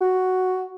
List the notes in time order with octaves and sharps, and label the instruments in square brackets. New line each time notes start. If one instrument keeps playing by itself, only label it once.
[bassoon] F#4